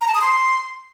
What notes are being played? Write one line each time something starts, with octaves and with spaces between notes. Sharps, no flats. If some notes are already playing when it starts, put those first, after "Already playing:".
A#5
A5
D#6
C6